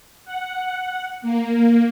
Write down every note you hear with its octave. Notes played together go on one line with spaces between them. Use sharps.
F#5
A#3